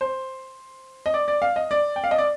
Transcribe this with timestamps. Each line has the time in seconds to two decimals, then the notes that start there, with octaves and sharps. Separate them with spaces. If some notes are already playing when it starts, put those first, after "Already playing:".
0.01 C5
1.06 D#5
1.14 D5
1.28 D5
1.42 F5
1.56 D#5
1.71 D5
1.96 G5
2.04 F5
2.11 D#5
2.18 D5